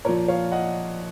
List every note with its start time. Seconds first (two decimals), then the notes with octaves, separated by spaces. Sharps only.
0.05 A#2 A#4 C#5
0.09 F3
0.28 C#5 F5
0.52 D#5 F#5